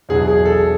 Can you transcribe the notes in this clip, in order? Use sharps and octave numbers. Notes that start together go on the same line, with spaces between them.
E2 B2 F#3 G#4
G#4
A4